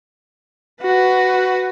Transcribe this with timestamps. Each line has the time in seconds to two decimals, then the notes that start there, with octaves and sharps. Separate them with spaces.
0.82 F#4 B4